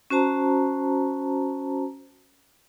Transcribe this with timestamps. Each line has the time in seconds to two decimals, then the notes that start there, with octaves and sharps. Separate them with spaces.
0.10 C#4 F#4 C5 A5 A#5